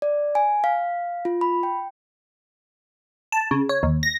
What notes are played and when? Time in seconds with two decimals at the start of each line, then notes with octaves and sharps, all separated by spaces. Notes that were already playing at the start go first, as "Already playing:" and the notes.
0.02 D5
0.35 G#5
0.64 F5
1.25 F4
1.41 B5
1.63 G5
3.32 A5
3.51 C#3
3.69 C#5
3.83 D#2
4.03 A#6